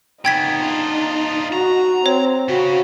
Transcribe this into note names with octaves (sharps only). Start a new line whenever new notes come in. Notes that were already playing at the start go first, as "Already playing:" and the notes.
C#3 B3 D#4 G5 G#6 B6
D4 F4
F#4 A#5
C4 C#5
C#3 F#4